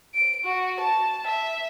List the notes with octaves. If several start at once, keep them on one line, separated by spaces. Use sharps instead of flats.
D7
F#4
A5
E5